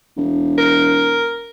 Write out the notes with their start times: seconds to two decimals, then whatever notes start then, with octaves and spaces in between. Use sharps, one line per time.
0.17 E1
0.58 A#4